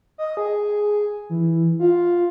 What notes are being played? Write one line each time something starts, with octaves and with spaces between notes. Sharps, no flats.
D#5
G#4
E3
F4